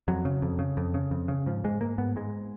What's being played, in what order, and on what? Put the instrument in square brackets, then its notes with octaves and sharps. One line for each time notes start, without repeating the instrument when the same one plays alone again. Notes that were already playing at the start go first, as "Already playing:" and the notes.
[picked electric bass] F2 F#3
C#3
F2
C#3
F2
C#3
F2
C#3
G#2 F3
G#2 G#3
G#2 A#3
G#2 B3
G#2 G#3